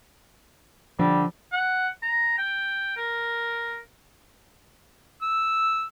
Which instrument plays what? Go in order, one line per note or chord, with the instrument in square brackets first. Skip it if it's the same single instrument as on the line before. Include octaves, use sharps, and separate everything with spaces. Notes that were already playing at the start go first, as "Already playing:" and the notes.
[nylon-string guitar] D3 [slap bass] F3 [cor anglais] G3
[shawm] F#5
A#5
G5
A#4
[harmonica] E6